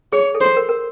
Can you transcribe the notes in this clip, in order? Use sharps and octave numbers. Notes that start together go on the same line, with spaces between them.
G#4 C#5
A4
C5
A#4
A#4